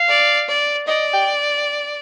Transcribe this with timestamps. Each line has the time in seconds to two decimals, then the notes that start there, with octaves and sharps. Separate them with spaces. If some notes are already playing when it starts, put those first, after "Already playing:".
Already playing: F5
0.09 D5
0.48 D5
0.87 D5 D#5
1.13 G5